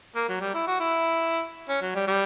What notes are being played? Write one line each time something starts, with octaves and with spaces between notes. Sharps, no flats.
A#3
F#3
G3
E4
F#4
E4
C#4
F#3
G3
G3